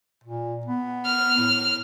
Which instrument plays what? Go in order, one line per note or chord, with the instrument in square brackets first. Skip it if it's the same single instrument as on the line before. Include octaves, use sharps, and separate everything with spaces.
[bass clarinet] A#2
B3
[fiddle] F6
[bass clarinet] A2